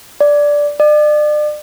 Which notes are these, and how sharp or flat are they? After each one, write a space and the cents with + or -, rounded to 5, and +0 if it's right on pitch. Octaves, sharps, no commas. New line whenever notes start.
D5 -5
D5 +35